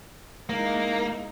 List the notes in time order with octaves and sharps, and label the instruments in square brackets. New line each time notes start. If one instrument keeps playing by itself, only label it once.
[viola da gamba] G#3 D#4 E4 [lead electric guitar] A#3